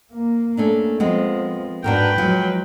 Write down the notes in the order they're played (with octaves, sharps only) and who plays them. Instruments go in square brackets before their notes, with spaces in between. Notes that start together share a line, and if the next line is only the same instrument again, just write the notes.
[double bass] A#3
[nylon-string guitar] A3 C#4 D4
[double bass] F3 [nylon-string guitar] G#3 B3 C4
[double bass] G#2 [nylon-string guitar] D4 F#4 A#4 [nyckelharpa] B4 G5
[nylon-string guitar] F3 [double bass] F#3 G#3